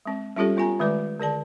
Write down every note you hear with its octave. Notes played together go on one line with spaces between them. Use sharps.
G#3 C4
G3 C#4 F4 G4 A4 C#5
B3 F4 C#5 G#5 A#5
D#3 G#3 A3 B4 D5 D6
D3 G#4 D5 A5